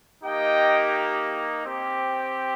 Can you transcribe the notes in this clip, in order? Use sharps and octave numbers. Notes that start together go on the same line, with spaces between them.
A#3 D#4 G4 D#5 G5
C4 G4